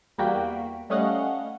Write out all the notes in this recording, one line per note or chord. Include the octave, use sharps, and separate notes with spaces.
E2 G3 A#3 F#4 G5 B6
G3 A3 C#4 D#5 F5 F#5